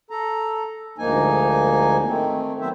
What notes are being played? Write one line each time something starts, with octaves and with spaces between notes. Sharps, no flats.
A4 A#5
D2 G#2 F3 A#3 D#4 G#5
D#3 A3 C4
F#3 B3 C4 C5 E5